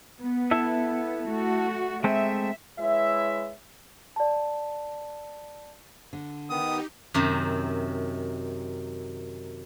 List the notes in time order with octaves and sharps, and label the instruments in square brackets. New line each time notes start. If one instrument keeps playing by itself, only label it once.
[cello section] B3
[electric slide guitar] E4 A4 E5
[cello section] A3 F#4
[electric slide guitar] G#3 A3 C4 [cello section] E5
[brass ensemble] G#3 E4 B4 C#5 E5
[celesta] D5 A5
[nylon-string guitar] D3
[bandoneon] D#3 B3 [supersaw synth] D#4 G4 [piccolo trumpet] D#6
[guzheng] F#2 C3 D#3